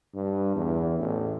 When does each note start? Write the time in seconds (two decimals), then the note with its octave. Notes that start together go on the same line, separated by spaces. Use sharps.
0.14 G2
0.55 E2
0.99 A1